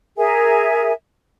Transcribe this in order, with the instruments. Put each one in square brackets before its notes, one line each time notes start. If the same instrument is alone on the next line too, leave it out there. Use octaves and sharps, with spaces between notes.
[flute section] G#4 A#4 E5 G#5